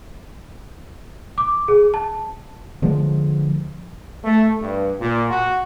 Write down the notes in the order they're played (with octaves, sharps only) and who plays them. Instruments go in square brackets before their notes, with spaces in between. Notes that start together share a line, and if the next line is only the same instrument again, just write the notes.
[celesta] D6
G#4
A5
[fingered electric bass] D3 F3 G#3
[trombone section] A3
G2
A#2
F#4